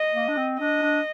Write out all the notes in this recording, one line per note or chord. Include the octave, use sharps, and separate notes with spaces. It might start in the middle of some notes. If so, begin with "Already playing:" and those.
Already playing: D#5
A#3
D4
C4
D4 D#5
D4